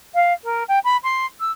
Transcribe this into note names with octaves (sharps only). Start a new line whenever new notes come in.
F5
A#4
G5
B5
C6
E6